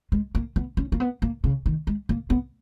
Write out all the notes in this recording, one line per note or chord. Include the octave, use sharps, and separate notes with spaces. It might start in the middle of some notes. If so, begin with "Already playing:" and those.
G#3
A#3
B3
C#4
A#3
B3
A#3
C#3
D#3
G#3
A#3
B3